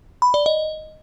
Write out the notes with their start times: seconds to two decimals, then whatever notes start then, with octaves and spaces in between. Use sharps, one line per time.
0.22 B5
0.34 D5
0.46 D#5